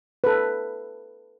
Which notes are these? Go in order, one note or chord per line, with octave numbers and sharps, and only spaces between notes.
A4 B4